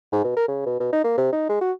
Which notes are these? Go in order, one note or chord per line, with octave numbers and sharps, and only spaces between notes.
G#2
B2
A#4
C#3
B2
B2
D#4
A#3
C3
D#4
G#3
F#4